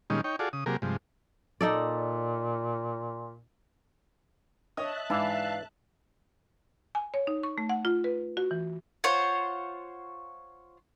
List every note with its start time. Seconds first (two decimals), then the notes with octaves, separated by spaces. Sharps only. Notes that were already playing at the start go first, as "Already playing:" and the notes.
0.10 A#2 D#3 G3 G#3 C#4 D#4
0.24 D#4 C#5 G5
0.39 F4 F#4 G#4 A4 D5
0.53 C#3 D#6
0.66 C3 F#3 A#3 G4 G#4 A#4
0.82 G2 C3 F3 G#3
1.61 A#2 D#4 A4 D5
4.77 C#5 D#5 E5 A5 D#6 F#6
5.10 G#2 E3 D4 F5
6.95 G#5
7.14 C#5
7.27 D#4
7.43 C#6
7.58 A3
7.69 F#5
7.85 F4
8.04 B4
8.37 F#4
8.51 E3
9.04 F4 C5 C#5 F#5